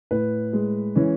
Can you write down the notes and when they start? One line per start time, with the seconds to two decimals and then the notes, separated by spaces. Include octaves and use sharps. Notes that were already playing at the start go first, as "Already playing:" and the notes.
0.11 A2 B4
0.53 G#3
0.96 E3 C#4